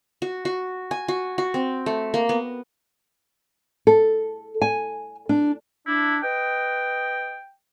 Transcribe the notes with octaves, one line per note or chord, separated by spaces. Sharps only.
F#4
F#4
G#5
F#4
F#4
C4
A3
A#3
B3
A4
G#5
D4
D4 E4
B4 D#5 G5